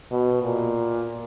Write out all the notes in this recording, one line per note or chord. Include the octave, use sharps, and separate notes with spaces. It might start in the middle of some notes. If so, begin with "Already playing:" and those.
B2
A#2